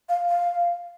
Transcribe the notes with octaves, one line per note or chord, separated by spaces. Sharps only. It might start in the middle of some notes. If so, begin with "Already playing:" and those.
F5
F5